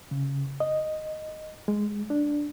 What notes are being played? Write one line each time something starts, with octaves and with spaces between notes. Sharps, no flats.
C#3
D#5
G#3
D4